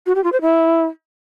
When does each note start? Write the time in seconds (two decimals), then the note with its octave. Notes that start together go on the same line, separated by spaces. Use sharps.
0.06 F#4
0.15 G4
0.24 F4
0.32 C5
0.41 E4